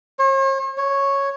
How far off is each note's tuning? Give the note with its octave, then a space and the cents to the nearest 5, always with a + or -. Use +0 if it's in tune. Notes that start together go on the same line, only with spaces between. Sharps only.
C#5 -45
C#5 -5